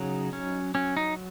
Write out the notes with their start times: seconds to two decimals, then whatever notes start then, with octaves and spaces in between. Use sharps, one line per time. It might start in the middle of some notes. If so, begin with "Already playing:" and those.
Already playing: C#3 F#3 D#4
0.33 C#4
0.75 F#3 C#4
0.97 D#4